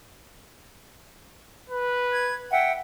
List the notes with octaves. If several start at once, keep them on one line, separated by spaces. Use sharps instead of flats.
B4
G#6
E5 F#5 G5